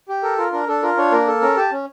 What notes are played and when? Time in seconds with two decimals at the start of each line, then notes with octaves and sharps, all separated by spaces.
0.09 G4
0.23 A4 A#4
0.38 F4 A#4
0.52 D4 A#4
0.67 D4 A4
0.83 F4 A#4
0.97 D4 C#5
1.12 A#3 A#4
1.27 A4
1.41 C#4 A#4
1.57 G4 A5
1.72 C#4